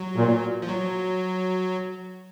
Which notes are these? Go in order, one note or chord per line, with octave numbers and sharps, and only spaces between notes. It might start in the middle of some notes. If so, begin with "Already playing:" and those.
Already playing: F#3
A#2
F3
F#3